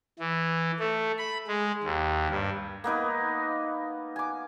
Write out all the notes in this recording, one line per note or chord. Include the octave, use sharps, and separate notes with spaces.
E3
A3
B5
G#3
D#2
G2
A#3 B3 D#4 B4
G#5 D6